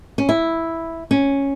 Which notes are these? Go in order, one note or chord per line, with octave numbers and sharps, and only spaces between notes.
C#4
E4
C#4